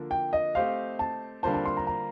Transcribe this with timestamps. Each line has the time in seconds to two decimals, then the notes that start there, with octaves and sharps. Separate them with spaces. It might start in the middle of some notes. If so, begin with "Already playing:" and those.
Already playing: D3 F3 A#3 D4 A4
0.11 G5
0.33 D#5
0.55 A3 C4 G4 C5 D#5 F5
0.99 A5
1.43 D3 G3 A#3 F4 C5 A5
1.54 A5
1.65 C6
1.77 A#5
1.87 A#5